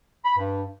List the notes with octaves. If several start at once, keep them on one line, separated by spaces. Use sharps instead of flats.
B5
G2